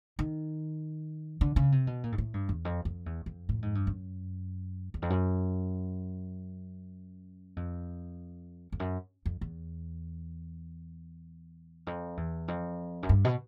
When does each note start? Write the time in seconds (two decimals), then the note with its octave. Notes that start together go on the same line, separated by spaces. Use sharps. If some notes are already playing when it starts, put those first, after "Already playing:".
0.19 D#3
1.41 D3
1.56 C#3
1.72 C3
1.87 B2
2.03 A#2
2.12 G#2
2.18 A2
2.34 G2
2.49 E2
2.65 F2
2.85 F2
3.06 E2
3.26 F2
3.49 A2
3.62 G#2
3.75 G2
3.87 F#2
4.94 E2
5.02 F2
5.10 F#2
7.56 F2
8.72 F2
8.80 F#2
9.26 F2
9.41 E2
11.87 F2
12.17 E2
12.48 F2
13.03 F#2
13.09 G2
13.25 B2